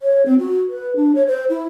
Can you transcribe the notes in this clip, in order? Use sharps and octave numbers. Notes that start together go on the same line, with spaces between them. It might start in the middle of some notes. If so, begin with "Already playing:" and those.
C#5
C4
F#4
B4
D4
C#5
C5
E4